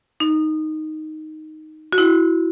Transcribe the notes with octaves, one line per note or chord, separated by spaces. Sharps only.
D#4
F#4
E4